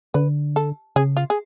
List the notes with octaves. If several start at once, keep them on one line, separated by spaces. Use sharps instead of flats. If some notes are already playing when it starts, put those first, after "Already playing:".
D3 B4
A4
C#3 G#4
F4
G#4